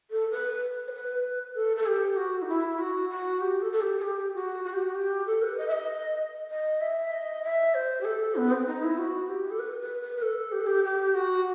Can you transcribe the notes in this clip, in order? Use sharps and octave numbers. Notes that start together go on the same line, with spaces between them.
A4
B4
C5
B4
A4
A4
G4
F#4
D#4
E4
F#4
F#4
G4
A4
A4
G4
A4
G4
F#4
F#4
G4
F#4
G4
A4
B4
D#5
E5
D#5
D#5
E5
D#5
E5
C5
G4
A4
B3
C4
D#4
E4
F#4
G4
A4
B4
B4
B4
B4
A4
G4
A4
G4
G4
F#4